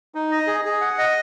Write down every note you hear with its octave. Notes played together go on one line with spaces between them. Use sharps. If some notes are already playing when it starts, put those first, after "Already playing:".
D#4
D#5
G#4
G#4
F#5
D#5